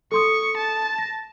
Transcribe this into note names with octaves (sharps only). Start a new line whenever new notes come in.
A4 C6 C#6 D#6
A5
A#6